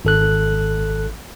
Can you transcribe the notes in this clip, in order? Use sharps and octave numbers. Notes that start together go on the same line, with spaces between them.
G#1 A4 F#6